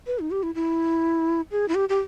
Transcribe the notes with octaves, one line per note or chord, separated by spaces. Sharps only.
B4
D#4
G4
E4
E4
G#4
E4
G4
G4